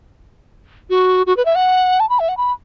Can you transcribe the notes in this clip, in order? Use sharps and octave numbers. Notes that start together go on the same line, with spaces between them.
F#4
F#4
B4
E5
F#5
A5
B5
E5
F#5
B5